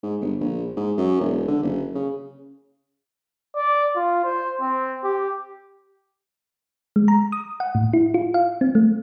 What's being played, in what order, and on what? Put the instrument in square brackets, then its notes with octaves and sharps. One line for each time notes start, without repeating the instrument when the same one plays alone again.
[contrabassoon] G#2
G1
A#1
G#2
F#2
E1
D3
F#1
C#3
[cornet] D5
F4
C5
C4
G4
[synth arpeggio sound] G#3
A#5
D#6
F#5
A2
E4
F4
F5
C4
A3